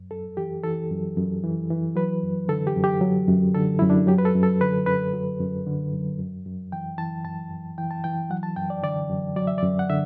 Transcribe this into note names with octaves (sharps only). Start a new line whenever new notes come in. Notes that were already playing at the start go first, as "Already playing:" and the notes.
Already playing: F#2
F#2 A4
E3 G4
E3 A4
F#2
F#2
E3
E3
F#3 B4
F#2
D3 A4
G4
F#2
G4
F#3
F#2
D3 A4
F#2 E4
D4
F#3 G4
B4
A4
F#2
A4
D3 B4
F#2 B4
F#3
F#2
D3
F#2
F#2
F#2
E3 G5
E3 A5
F#2 A5
F#2
E3 G5
A5
E3 G5
F#3 F#5
A5
F#2 G5
D5
D3 D5
F#2
F#3 D5
E5
D5
F#2
F#5
D3 E5